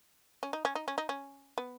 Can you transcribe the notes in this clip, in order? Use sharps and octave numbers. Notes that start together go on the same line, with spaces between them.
C#4
D#4
C#4
D#4
C#4
D#4
C#4
B3